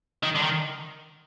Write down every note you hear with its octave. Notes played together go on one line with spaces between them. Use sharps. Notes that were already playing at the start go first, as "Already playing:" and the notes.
D#3
D3
D#3